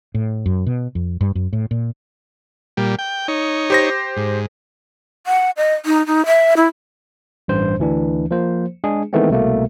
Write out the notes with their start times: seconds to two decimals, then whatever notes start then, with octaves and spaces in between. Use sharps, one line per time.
0.14 A2
0.46 F#2
0.66 B2
0.95 F2
1.21 G2
1.35 F#2
1.53 A2
1.71 A#2
2.77 A#2 G3
2.99 G5
3.28 D#4 C#5
3.70 G4 C5 A#6
4.16 G#2
5.27 F#5
5.57 D#5
5.86 D#4
6.07 D#4
6.26 E5
6.57 E4
7.48 A1 G2 C5
7.79 D2 E3 D4
8.31 F3 A#3 C5
8.84 G#3 D4 G#4
9.13 D#3 E3 G#3 A3 B3 C4
9.30 C2 B2 A3 A#3